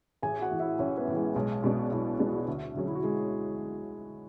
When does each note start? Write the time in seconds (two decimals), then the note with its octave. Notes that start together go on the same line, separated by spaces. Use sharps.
0.22 A1 G#4 G#5
0.41 F#4 F#5
0.51 A2 E3
0.60 E4 E5
0.79 A1 C#4 C#5
0.98 B3 B4
1.08 A2 E3
1.16 G#3 G#4
1.35 B1 G#3 G#4
1.63 B2 G#3 B3 D4 F#4
1.91 B1 E4
2.19 B2 G#3 B3 D4 G#4
2.27 F#4
2.33 E4
2.41 F#4
2.48 D2
2.75 D3 F#3 C#4 G#4
2.87 E4
2.95 F#4
3.03 G#3 G#4